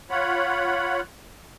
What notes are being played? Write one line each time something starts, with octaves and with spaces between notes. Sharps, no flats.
F4 C#5 F#5 B5